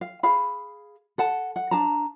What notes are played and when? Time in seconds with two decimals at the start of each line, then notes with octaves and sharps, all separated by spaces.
0.01 F5
0.23 G#4 F5 B5
1.18 A4 F#5 A5
1.56 F#5
1.71 D4 A5 A#5